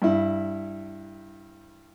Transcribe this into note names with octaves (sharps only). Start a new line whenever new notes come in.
G2 E4